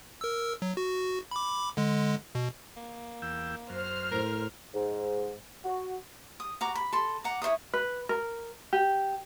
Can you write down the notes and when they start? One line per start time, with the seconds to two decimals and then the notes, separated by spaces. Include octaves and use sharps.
0.21 A#4 E6
0.62 F#3
0.77 F#4
1.31 B5 D6
1.77 D3 G#3
2.35 B2
2.77 A#3
3.22 E2 G5 E6
3.70 F#2 C5 F6
4.12 A2 A#4
4.74 G#2
5.65 F#4
6.40 D#6
6.61 F#4 A#5 D6
6.75 B5
6.93 A4 C6
7.24 F#5 A#5 D6
7.42 E4 C5 C#5 D#6
7.74 B4
8.09 A#4
8.73 G4